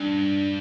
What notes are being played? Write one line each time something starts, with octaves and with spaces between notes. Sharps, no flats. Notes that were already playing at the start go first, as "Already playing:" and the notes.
Already playing: G2 D4